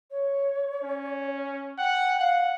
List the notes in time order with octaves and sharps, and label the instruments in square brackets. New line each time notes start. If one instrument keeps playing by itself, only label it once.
[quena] C#5
[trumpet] C#4
[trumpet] F#5 [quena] G5
[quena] F5 [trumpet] F#5